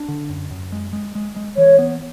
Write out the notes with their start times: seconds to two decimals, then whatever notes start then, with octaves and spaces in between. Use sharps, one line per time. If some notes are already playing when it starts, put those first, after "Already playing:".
Already playing: D4
0.08 D3
0.29 F#2
0.51 F#2
0.72 G#3
0.93 G#3
1.15 G#3
1.36 G#3
1.57 E3 C#5
1.79 B3